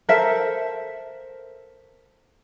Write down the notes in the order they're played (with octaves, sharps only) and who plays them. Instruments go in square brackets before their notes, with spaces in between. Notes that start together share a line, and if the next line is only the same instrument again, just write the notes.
[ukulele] A4 A#4 C5 E5